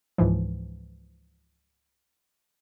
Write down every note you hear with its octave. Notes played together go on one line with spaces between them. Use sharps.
C#2 G#2 E3 F3